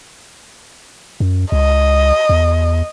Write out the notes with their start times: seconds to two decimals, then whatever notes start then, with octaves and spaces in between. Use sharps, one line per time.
1.20 F#2
1.52 C#2 D#5
2.29 E2